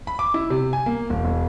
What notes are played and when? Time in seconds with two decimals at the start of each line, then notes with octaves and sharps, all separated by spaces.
0.07 B5
0.19 D6
0.34 E4
0.50 C3
0.73 G#5
0.86 A#3
1.10 E1
1.25 E1